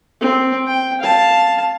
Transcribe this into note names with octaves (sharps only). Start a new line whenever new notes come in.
C4
G5
F5 A5